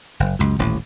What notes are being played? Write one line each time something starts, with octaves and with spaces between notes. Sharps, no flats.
F#1
C#2 F#2
D#1 A1